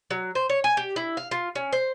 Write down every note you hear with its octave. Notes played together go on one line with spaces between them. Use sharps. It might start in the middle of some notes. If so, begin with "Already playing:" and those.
F#3
C5
C#5
G#5
G4
E4
F5
F4
C#4
C5